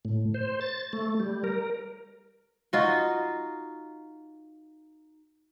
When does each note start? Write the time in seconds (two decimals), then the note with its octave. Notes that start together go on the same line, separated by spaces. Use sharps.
0.05 A2
0.34 C5
0.61 A6
0.93 A3
1.20 G3
1.44 A#4
2.73 D#4 F4 F#4